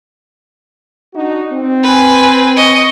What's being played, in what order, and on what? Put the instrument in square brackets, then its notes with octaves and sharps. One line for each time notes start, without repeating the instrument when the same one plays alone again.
[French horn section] D4 D#4 F#4
C4
[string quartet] B4 G#5
D#5 C#6